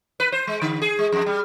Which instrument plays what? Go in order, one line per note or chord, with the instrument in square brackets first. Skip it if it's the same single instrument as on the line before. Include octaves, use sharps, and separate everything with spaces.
[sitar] B4
C5
G#3
D3
G#4
G#3
F2
G3